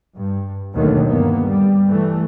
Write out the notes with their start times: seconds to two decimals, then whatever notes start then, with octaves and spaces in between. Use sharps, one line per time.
0.16 G2
0.74 D#2 B2 D3 D#3 F#3 A3
1.07 G2 A#3 B3
1.47 G3
1.89 E3 A3